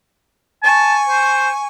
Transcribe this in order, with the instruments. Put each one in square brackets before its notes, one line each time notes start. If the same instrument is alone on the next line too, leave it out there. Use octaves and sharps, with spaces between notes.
[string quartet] G#5 C#6 [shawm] A5
[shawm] C5